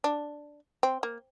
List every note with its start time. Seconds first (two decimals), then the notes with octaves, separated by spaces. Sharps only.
0.04 D4
0.83 C4
1.03 A#3